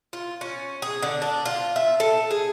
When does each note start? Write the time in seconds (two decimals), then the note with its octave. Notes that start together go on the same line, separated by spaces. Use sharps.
0.13 F4
0.41 C#4
0.82 G#4
1.02 D3
1.22 D4
1.45 F4
1.76 E5
2.00 A4
2.31 G#4